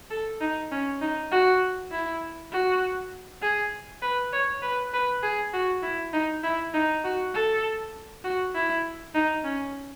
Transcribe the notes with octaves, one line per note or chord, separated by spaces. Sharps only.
A4
D#4
C#4
D#4
F#4
E4
F#4
G#4
B4
C#5
B4
B4
G#4
F#4
E4
D#4
E4
D#4
F#4
A4
F#4
E4
D#4
C#4